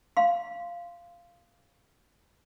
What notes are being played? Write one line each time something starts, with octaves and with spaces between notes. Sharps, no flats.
F5 C6